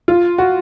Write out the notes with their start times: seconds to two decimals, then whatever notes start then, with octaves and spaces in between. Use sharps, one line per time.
0.08 F4
0.38 F#4